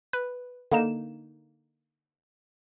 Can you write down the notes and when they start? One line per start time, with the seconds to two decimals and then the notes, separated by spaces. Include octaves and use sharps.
0.13 B4
0.72 D3 A#3 D#4 E7